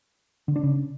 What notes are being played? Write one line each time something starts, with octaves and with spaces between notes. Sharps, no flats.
D3
D4
C#3